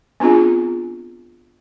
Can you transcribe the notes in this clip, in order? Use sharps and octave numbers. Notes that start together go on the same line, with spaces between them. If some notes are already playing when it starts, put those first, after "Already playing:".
B3 C4 D4 F4 G#4